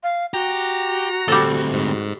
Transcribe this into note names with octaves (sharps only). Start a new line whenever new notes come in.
F5
F#4 G4 A#5
D2 G3 C4 A4
G#2